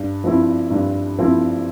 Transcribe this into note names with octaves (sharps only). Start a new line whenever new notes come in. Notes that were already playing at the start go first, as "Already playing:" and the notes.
Already playing: G2
F3 C4 E4
G2
F3 C4 E4